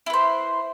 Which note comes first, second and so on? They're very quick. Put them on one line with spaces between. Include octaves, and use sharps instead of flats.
E4 B4 C5